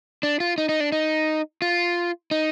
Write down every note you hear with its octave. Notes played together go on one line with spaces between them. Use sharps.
D4
F4
D#4
D#4
D4
D#4
F4
D#4